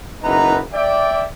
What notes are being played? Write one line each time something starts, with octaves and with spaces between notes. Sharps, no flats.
F#1 E3 B3 D#4 B4 A#5
D5 E5 G5